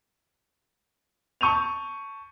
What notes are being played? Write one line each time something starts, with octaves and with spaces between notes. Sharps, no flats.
A5 C#6 G6 D#7 F7